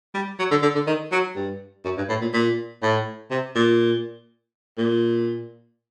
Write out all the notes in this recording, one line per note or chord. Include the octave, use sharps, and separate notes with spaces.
G3
F#3
D3
D3
D3
D#3
F#3
G2
F#2
G2
A2
A#2
A#2
A2
C3
A#2
A#2